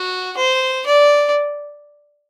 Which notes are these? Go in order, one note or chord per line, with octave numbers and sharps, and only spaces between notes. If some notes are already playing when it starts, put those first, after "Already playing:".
Already playing: F#4
C5
D5